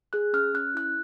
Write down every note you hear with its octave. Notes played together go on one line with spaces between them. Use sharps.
G#4 F#6
C#4 F6
C#4 F#6
E4 F#6